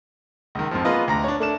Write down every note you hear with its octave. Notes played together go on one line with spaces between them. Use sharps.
C#2 D#3
F2 G#2 F3
G#3 A#3 B3 F4 B4 D#5
D2 A#5 A#6
D4 C#5
A3 D4 E7